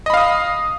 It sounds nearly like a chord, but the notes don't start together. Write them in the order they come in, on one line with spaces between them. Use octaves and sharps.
D#5 B5 F5 D#6